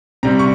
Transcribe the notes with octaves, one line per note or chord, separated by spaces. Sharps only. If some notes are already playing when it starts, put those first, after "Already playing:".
C3 G3 C4 A#5
C#6